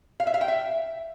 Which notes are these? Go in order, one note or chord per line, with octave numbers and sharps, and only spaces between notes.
F5
E5
F5
G5
E5